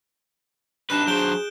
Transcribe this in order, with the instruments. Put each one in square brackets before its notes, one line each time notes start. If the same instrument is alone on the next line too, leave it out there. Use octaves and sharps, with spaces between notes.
[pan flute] D4 [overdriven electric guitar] D#4 B4 [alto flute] G4 [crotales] F#6 E7
[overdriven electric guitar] F#3 C5 [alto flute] G#4 [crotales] G6 D7 G7